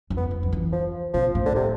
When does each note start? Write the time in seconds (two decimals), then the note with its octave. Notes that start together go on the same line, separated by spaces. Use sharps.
0.10 F2
0.17 B3
0.31 F2
0.43 F3
0.53 E3
0.72 F3
1.14 B2 F3
1.35 A2
1.46 D3
1.55 C3